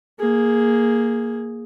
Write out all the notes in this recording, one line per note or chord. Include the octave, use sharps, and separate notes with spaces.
A#3 G#4